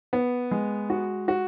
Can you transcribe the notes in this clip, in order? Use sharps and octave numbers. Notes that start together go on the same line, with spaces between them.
B3
G#3
F#4
F#4